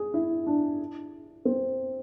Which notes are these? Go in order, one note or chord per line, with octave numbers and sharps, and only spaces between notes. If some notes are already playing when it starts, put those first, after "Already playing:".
Already playing: G#4
E4
D4
C4